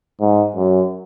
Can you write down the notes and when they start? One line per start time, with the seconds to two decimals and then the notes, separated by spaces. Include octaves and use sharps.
0.20 G#2
0.56 F#2